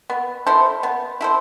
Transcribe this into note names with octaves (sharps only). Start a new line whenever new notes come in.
B3
E4 A4 C5
B3
E4 A4 C5